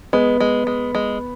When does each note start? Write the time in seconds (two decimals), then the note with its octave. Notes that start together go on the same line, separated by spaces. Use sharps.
0.13 G#3 B3
0.40 G#3
0.67 G#3
0.95 G#3